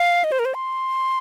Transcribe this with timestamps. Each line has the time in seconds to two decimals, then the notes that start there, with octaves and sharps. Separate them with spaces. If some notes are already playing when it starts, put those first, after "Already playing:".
Already playing: F5
0.24 D#5
0.32 C5
0.39 A#4
0.45 C5
0.54 C6